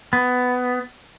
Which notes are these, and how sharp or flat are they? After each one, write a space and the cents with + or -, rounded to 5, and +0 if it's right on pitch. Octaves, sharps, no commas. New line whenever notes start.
B3 +15